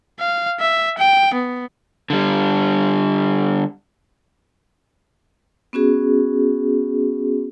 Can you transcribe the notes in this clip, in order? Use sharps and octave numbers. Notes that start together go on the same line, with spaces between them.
F5
E5
G5
B3
D3 G3
B3 C#4 F#4 G#4